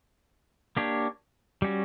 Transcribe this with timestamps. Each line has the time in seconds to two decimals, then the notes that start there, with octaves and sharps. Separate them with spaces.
0.77 A#3 D4 G4 C#5
1.62 G3 C#4 F#4